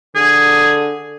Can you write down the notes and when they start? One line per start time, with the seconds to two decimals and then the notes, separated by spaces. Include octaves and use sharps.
0.15 D3 G#4